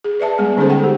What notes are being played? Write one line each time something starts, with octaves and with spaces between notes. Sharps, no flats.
G#4
B4 D5 E5 A5
G3 G#3 B3 G#4
D3 C#4 D#4 G#4 A4 C5
F#5 G5
G4